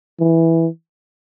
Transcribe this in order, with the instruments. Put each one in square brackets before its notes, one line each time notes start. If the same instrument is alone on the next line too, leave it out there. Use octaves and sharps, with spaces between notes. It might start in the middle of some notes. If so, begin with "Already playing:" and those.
[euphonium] E3